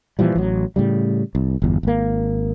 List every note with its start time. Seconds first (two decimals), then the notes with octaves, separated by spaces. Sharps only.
0.19 A#2 E3 F3 G3
0.36 A1 F#3
0.76 A2 C#3 G3
1.35 C2
1.62 G1 E2
1.83 G#1 A#3